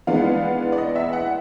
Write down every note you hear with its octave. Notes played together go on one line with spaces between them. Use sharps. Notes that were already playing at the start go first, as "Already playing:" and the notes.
E3 G#3 B3 D4 F5
D5
D#5
E5
F#5